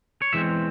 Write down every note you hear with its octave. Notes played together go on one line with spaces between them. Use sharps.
C#5
E2 E3 G#3 C4 E5